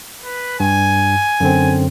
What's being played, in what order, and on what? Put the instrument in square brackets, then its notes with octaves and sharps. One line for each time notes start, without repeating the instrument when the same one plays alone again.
[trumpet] B4
[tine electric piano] G2 [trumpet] G#5
[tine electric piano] F#2 D3 C4